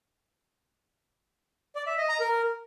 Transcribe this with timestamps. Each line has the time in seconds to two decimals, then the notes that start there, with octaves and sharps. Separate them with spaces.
1.75 D5
1.87 E5
1.98 D#5
2.09 A#5
2.20 A#4